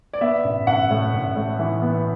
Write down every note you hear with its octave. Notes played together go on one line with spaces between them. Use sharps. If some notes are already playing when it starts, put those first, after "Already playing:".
D5
B3 E5
A1
A1 F#5
A2
A1
A2
E3
B3